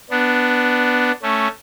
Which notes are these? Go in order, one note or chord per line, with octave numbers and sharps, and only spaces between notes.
B3 D4
A3 C#4